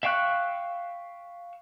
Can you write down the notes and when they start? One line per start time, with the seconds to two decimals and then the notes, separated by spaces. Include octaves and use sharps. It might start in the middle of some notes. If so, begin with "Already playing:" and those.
0.03 E5 F5 G5 C#6 F#6